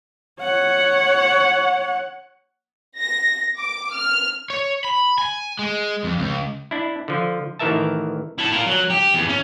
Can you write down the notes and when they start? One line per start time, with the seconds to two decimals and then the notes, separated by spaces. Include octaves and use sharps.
0.42 C#5 F#5
2.98 A#6
3.58 D6
3.93 F6
4.50 C#5
4.85 B5
5.18 G#5
5.59 G#3
6.04 F2
6.19 C#2
6.71 D4 E4
7.08 D3 F3
7.59 A1 D#3 E3 A#4 E5 A5
8.39 E4 A4
8.52 F4 A#4
8.66 F#3
8.90 G4
9.14 E2
9.29 C#4